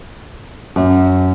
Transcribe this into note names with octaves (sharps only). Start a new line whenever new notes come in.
F#2